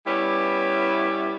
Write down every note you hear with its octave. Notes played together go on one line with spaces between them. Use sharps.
G3 B3 C#4 E4